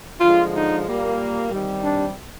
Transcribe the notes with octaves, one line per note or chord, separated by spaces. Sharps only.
D3 F3 G#3 F4
D#4
A#2 G3 A#3
C3 D#3 G3
D4